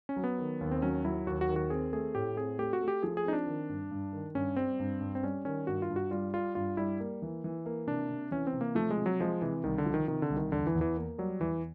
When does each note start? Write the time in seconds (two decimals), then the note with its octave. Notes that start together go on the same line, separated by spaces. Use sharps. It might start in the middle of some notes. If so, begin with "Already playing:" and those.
0.09 C#4
0.16 F#3
0.24 B3
0.38 D#3
0.61 D#2
0.71 C4
0.82 F#3 C#4
1.05 F#3 E4
1.26 D#2 F#4
1.41 F#4
1.49 D#3
1.56 F#4
1.70 C4 G#4
1.93 A3 G#4
2.15 A2 G4
2.36 C4 G#4
2.59 A3 G4
2.73 F#4
2.81 A3
2.88 G4
3.03 F3 G#4
3.17 G#4
3.24 C4 D#4
3.33 D4
3.46 D#3
3.69 G2
3.91 G2
4.13 D#3
4.35 G2 C#4
4.56 G3 C4
4.79 G2
5.01 G2
5.15 C4
5.23 G3 C#4
5.45 D#3 C#4
5.67 G2 F#4
5.82 F4
5.90 G2
5.96 F#4
6.11 G3 F4
6.34 G3 F4
6.55 G2 F4
6.77 G3 E4
7.00 A#3
7.22 E3
7.44 E3
7.66 A#3
7.87 C3 D4
8.10 C3
8.31 E3 C#4
8.47 C4
8.53 C3
8.61 A#3
8.75 F3 A3
8.91 G#3
8.97 C3
9.06 F#3
9.20 F3 G#3
9.42 C3 E3
9.64 C2 D#3
9.78 D3
9.86 F3
9.94 D#3
10.08 C3 D#3
10.22 D3
10.30 C2
10.37 D#3
10.52 E2 D3
10.67 E3
10.75 E2
10.81 E3
10.96 A#3
11.18 F#3 G3
11.40 E2 E3